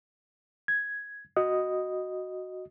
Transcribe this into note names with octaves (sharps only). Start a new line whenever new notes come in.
G#6
F#4 D#5 D#6